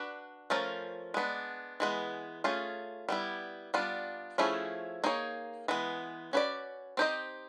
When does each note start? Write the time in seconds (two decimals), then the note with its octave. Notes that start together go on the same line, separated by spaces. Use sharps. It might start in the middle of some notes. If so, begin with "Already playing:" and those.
Already playing: D4 F#4 B4
0.50 F3 A3 C#4 F4 A#4
1.14 G#3 B3 D4
1.80 E3 G#3 B3
2.44 A3 C#4 F4 G#4
3.09 G3 B3 E4
3.74 G3 B3 D4 F4
4.38 F3 A3 C#4 E4 G#4
5.04 A#3 D#4 G#4 C#5
5.68 E3 G#3 B3
6.33 C#4 F#4 B4 D5
6.97 C4 D#4 G4 C5 D#5